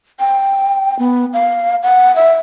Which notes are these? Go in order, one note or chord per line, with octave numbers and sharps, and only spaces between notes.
G5
B3
F5
F#5
E5